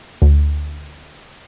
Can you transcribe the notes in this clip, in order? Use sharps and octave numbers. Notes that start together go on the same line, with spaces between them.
D2